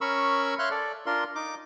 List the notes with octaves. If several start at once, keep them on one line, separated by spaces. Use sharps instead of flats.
C#4 A#4 B5 C#6 E6
C#5 E5 F5 C6 F6 F#6
A4 D5
D4 F4 A#4 C6
D#4 D6